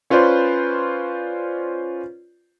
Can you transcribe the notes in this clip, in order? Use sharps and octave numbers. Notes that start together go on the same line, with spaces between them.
C#4 F4 B4 C5 D5